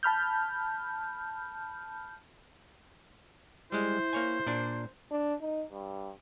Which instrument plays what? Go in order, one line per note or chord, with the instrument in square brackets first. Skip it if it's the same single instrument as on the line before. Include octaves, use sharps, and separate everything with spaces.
[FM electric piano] A5 B5 F6 G6
[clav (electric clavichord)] G3 G#3 [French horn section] E4 [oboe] C5
[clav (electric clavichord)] A#3 C#5 G#5
A#2 D4
[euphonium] D4
D#4
G2